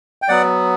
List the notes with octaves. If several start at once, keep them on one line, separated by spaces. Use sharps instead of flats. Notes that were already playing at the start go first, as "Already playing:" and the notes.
G5
F#3 B3 D5 F#5